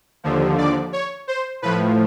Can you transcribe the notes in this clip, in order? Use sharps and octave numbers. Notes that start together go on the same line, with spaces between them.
D#2 D3 F3
D5
C#5
C5
A2 F3 B4